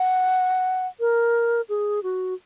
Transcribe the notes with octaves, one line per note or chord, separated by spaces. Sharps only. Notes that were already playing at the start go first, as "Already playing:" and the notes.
Already playing: F#5
A#4
G#4
F#4